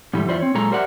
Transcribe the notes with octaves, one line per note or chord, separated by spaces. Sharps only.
G#2 D#3 E3 G3 A3
E2 E3 F4 C5 D5 E5
C4 C#5
A#2 F#3 G#3 A4 A#5
G4 A#4 C5 D5 E5 F#5